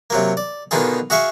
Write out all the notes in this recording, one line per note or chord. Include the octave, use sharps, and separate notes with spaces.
C3 F#3 A#3
D5
B2 D3 D#3 D#4 F4 G#4
F#4 G#4 E5 F5 C#6